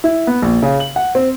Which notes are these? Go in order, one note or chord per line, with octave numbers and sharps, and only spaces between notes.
E4
B3
A#1
C#3
F#7
F#5
C4